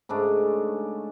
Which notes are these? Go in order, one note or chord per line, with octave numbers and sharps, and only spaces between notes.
G#2 C#3 A3 D4